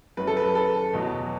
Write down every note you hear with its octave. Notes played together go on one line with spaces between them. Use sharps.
F#2 F#3 B4
A4
B4
A4
E2 B2 F#3